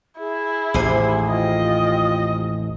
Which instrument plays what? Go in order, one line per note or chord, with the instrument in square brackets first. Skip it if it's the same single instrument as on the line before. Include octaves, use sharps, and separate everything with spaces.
[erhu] E4 [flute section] G#4
[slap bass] A1 D#2 A2 [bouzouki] C3 C5 G#5
[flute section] F4 G5 D#6 [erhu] D#5